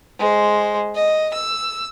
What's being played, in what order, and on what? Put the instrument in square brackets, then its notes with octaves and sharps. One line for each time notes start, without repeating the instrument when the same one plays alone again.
[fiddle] G#3 C5
D#5
E6